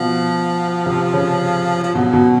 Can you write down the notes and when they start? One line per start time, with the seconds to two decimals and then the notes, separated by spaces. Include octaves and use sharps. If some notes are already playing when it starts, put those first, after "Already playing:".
Already playing: B2 F3
0.86 C3
1.13 C#3
1.84 F3
1.95 B2 F#3
2.13 B2